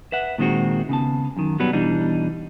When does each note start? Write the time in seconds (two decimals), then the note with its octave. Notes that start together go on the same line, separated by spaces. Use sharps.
0.12 B4 E5 F#5
0.38 A#2 D#3 G#3 C4 F#4
0.89 C#3 B3 A5
1.37 F#2 D#3
1.59 B2 F#3 G3 B3 B4
1.73 B2 E3 G3 D4 D#4